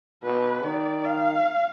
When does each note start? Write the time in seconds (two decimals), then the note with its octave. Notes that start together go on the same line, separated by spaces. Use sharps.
0.22 B2 B4
0.64 D#3 D5
1.05 F5